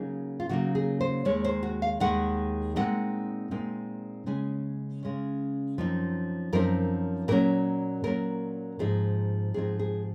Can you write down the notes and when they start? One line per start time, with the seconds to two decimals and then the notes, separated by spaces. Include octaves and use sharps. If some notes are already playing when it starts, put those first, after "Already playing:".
Already playing: C#3 F#3 A#3 D#4 G#4
0.40 F4
0.49 C#3 F#3 A#3 D#4 F#4
0.75 G#4
1.01 C5
1.25 D#2 D#3 G#3 C#5
1.45 C5
1.63 F#4
1.82 F5
2.00 D#2 D#3 G#3 F#5
2.76 A#2 G#3 C4 D#4 F#5
3.51 A#2 G#3 C4 D#4
4.26 C#3 G#3 C#4 G#5
5.03 C#3 G#3 C#4
5.78 F#2 F3 C4 D#4
6.53 F#2 F3 C4 D#4 A#4
7.28 A#2 F#3 C#4 A#4
8.04 A#2 F#3 C#4 A#4
8.79 G#2 F3 C4 D#4 G#4
9.54 G#2 F3 C4 D#4 G#4
9.79 G#4